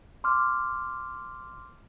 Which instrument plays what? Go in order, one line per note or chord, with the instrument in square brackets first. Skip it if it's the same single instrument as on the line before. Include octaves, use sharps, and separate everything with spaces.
[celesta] C6 D6 F6